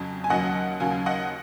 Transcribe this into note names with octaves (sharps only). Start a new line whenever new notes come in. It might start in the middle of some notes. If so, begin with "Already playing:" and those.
Already playing: F2 C#3 F#3
G#5
D#2 C#3 F#3 D#5 F#5
D#2 C#3 F#3 F5 G#5
D#5 F#5